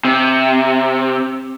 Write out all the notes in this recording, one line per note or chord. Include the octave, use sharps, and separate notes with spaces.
C3